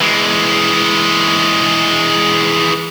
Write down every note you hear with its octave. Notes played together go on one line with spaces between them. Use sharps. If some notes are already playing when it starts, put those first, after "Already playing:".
E3 G#3